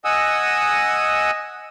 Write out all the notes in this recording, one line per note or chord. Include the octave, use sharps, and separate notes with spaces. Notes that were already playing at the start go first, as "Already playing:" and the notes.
D#5 F#5 G#5 D#6 E6